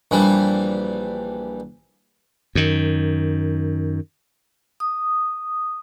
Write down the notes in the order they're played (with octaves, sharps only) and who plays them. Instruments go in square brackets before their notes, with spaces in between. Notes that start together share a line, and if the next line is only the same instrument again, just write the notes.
[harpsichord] A#1 E3 G3
[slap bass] F#2 D#3
[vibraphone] D#6